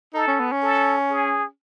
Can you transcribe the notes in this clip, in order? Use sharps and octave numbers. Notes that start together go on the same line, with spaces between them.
D#4 A4
C#4
B3
C#4
A4
G#4